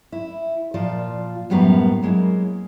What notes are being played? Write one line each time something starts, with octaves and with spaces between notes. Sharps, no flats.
E4
A#2 F3 F4 D5
F#2 A2 G3 A#3 B3 A#5
F#3 G#3 A#3 E4